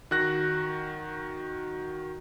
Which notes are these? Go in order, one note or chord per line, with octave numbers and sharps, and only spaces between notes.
D#3 F#4 F#6 A#6